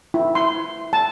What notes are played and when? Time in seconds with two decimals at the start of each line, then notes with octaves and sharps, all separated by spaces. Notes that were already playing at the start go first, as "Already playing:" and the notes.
0.14 E4
0.35 C6
0.93 A5